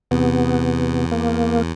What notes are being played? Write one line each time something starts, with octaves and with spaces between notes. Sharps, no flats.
E2 C3 B3
A#3